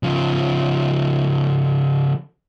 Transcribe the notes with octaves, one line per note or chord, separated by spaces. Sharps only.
C#3 F3